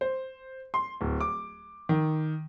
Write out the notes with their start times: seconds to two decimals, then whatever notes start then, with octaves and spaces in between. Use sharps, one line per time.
0.01 C5
0.74 C6
1.01 D1
1.20 D6
1.89 D#3